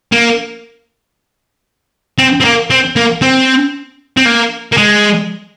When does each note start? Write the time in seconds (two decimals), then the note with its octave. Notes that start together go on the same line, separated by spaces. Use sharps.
0.12 A#3
2.18 C4
2.41 C4
2.45 A#3
2.70 C4
2.96 A#3
3.22 C4
4.17 C4
4.26 A#3
4.72 A#3
4.77 G#3